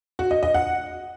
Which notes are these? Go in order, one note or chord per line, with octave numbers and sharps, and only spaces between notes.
F#4
D#5
D#5
F#5